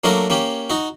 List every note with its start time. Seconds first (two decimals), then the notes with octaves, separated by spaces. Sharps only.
0.04 F#3 A3 A#3 D4 A#4
0.30 A#3 C#4 G4
0.70 D#4 F#4